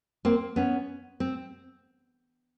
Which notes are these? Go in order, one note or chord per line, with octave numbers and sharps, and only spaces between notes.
A#3 C4
B3 C#4
C4